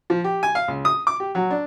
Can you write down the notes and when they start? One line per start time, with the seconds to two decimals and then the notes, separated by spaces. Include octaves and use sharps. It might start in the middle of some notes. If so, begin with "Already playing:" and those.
0.10 F3
0.24 G4
0.43 G#5
0.55 F5
0.68 C#2
0.85 D#6
1.07 D6
1.20 G4
1.35 F#3
1.51 D4